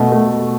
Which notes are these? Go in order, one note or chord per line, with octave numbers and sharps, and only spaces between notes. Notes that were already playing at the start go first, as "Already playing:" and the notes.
Already playing: B2 A3
A3